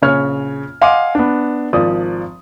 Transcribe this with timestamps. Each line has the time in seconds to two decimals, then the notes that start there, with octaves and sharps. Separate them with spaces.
0.02 A#1 C#3 C#5 F6
0.81 D#5 F5 F#5 G#5 C6 D6
1.15 B3 D4
1.73 G#1 F3 D5 D#6